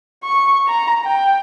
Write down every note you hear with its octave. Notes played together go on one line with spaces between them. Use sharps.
C#6
A#5
G5